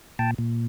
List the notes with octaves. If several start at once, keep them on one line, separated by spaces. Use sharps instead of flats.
A#2 G5 A5
A#2